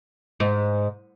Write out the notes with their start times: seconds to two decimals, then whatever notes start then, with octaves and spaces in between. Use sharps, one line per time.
0.40 G#2